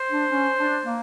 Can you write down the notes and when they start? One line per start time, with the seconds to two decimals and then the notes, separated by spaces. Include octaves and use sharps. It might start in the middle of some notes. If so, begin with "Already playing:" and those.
Already playing: C5
0.11 D4
0.30 C#4
0.58 D4
0.85 A#3